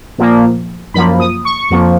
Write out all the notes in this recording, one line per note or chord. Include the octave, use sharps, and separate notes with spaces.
A#2 F3 A#3
F#2 F3 A#3 B5
D#6
C#6
F2 F3 A#3